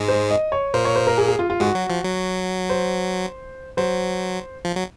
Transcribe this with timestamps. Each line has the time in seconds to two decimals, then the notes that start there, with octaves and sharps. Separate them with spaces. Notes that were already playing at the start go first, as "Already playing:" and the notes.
Already playing: G#2 G#3
0.08 C5
0.31 D#5
0.52 C#5
0.74 A#2 A#3 C5
0.85 C#5
0.96 C5
1.07 A#4
1.18 G#4
1.28 G#4
1.39 F4
1.50 F4
1.60 G#2 G#3 F#4
1.75 F#3
1.90 F3
2.04 F#3
2.70 C5
3.77 F#3 C5
4.65 F3
4.76 F#3